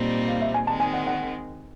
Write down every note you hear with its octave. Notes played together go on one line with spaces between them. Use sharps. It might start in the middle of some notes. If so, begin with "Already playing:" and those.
Already playing: A#2 G3 C4 D#4
F5
E5
G#5
D#3 G#3 C4 A5
G#5
F#5
F#5